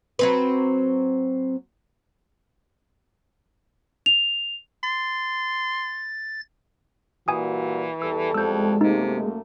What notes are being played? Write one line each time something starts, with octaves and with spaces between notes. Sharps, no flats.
F#3 C4 B4
F7
C6 A6
A#2 E3 G3 F#4 G5 G#5 D#6
E2 G3 A4 E6
F2 G#3 E6 G6
F#2 C3 A3 A#3 D#4